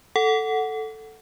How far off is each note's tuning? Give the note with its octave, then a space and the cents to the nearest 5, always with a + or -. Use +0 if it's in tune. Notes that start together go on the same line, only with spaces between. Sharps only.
A4 +0 F#5 +0